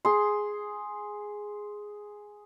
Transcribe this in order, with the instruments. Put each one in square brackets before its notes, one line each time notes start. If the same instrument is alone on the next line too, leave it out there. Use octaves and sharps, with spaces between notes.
[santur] G#4 C6